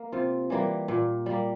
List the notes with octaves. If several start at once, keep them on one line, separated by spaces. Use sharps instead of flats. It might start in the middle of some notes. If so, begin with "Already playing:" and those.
Already playing: A#3
C3 F4
E3 G3 A#3
A#2
G3 A#3